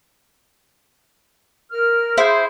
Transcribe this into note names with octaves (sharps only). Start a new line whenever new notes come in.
A#4 F6
E4 G#4 C5